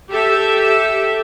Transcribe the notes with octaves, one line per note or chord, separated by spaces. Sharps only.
G4 A4 E5